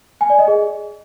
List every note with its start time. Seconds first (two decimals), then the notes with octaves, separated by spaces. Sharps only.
0.21 G#5
0.30 D5
0.39 D#5
0.48 G#4